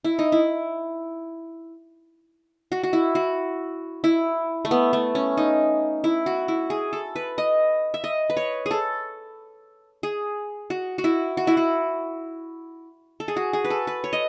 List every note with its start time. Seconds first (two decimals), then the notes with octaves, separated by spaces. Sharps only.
0.05 E4
0.19 D#4
0.32 E4
2.72 F#4
2.83 F#4
2.93 E4
3.15 F#4
4.04 E4
4.65 A3
4.71 B3
4.93 A3
5.15 C#4
5.37 D#4
6.04 E4
6.26 F#4
6.48 E4
6.70 G#4
6.93 A4
7.16 B4
7.38 D#5
7.94 E5
8.04 D#5
8.30 B4
8.37 C#5
8.66 G#4
8.71 A4
10.03 G#4
10.70 F#4
10.98 F#4
11.04 E4
11.37 F#4
11.47 E4
11.57 F#4
13.20 A4
13.28 G#4
13.36 F#4
13.53 G#4
13.65 B4
13.70 A4
13.87 B4
14.04 C#5
14.13 D#5